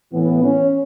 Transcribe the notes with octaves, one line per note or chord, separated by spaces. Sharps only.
A2 E3 B3
C#4